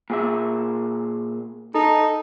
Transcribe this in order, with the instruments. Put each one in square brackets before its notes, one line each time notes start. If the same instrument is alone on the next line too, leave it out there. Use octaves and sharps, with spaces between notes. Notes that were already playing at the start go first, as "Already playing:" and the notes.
[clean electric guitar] A#2 G#4 E5
[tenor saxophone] D#4 [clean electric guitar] A4